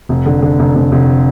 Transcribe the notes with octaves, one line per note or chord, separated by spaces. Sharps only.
F1
D3
D3
F1
F1
F1